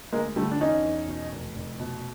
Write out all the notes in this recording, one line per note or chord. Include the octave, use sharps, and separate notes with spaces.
D2 G#3 A#3
D3 G3 A3
D4
E2 C#4 D#4
E2
B2
F1
F1
B2